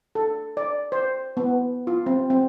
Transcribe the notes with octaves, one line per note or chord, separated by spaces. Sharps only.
A4
D5
C5
B3
F4
C4
C4